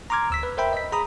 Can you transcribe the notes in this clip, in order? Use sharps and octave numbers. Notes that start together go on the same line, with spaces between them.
A#5 C6 D6 F6 G#6
D2 E6 B6
B4
A#4 C5 E5 G5 B5
D#5 B6
G#4 A#5 B5 D#6